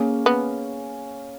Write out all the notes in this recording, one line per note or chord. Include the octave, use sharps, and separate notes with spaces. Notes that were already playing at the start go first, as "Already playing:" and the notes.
Already playing: A#3 C#4 G#4
B3